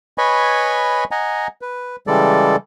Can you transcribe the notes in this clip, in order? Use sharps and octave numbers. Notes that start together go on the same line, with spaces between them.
B4 C#5 D#5 G#5 B5 C#6
D#5 F#5 G#5 A#5
B4
C#3 E3 G3 G#3 A4 D5